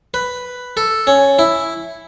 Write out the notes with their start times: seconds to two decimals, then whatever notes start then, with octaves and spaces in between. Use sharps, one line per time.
0.14 B4
0.77 A4
1.07 C#4
1.39 E4